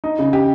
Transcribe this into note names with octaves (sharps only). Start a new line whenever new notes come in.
D#4
C#3
G4